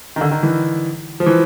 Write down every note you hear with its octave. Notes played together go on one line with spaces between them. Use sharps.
D#3
D3
D#3
E3
F3
E3